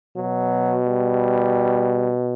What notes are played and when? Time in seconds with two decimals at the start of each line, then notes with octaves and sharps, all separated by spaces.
0.16 B2 F#3
0.87 G3